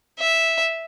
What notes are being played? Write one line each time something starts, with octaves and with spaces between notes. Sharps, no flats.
E5